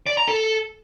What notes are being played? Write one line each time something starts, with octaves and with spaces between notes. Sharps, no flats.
D5
A#5
A4